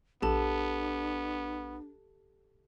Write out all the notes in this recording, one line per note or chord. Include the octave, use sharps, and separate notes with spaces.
A#1 B3 D4 G4 A4 A5